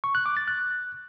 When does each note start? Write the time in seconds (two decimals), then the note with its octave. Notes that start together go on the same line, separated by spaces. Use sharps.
0.04 C#6
0.15 F#6
0.26 D6
0.37 A6
0.48 F#6